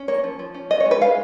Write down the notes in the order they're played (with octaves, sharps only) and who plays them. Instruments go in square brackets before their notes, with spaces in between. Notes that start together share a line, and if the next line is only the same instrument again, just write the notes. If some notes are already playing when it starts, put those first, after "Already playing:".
Already playing: [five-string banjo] C#4
A#3 C#5
F3
F3
C#4
B3 D#5
C#5
G#3
B4
G#3 F5